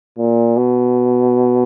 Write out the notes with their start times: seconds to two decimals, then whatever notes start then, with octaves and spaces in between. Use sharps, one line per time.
0.18 A#2
0.57 B2